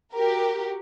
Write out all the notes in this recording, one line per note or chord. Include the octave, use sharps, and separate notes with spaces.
F#4 G4 A#4